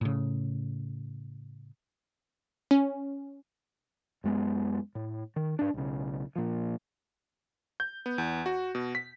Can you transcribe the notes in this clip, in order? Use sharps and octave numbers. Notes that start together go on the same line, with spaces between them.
A2 C#3
C#4
F#2 G#3 B3
A2
D#3
G#2 D4
B1 C#3
A#2 F3
G6
B3
E2
F#4
B2
B6